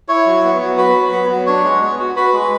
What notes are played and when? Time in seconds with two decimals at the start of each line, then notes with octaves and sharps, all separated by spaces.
0.08 E4 C#5 C#6
0.26 F#3
0.44 B3
0.61 F#3
0.77 F#4 B4 B5
0.95 F#3
1.12 B3
1.30 F#3
1.47 D4 C#5 C#6
1.64 G#3
1.81 B3
1.99 F#4
2.16 F#4 B4 B5
2.33 G#3